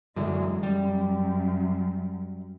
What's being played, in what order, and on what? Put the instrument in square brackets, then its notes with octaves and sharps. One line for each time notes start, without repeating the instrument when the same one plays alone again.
[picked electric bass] F#2 D3 E3 [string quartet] G#3
[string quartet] F#2 [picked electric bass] G3